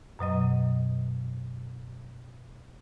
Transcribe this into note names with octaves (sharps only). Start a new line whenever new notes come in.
F#2 B2 F#3 D#5